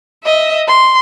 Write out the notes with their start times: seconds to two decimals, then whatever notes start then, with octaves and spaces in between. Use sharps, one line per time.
0.24 D#5 E5
0.68 C6